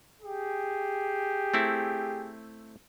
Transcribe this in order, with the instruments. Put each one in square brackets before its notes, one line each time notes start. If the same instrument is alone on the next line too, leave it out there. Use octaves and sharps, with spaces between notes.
[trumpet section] G4 G#4
[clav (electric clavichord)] A3 C4 E4